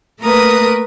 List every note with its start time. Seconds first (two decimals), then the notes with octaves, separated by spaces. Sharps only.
0.21 A3 A#3 A#4 B4 D#6